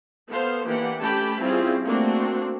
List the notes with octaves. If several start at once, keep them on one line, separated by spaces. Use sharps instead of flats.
B3 A4 C5 F5
E3 A#3 D4 G4 F#5
A3 C#4 G4 G5 A5 B5
G3 C4 C#4 E4 F4 G#4
A3 A#3 C4 D4 F#4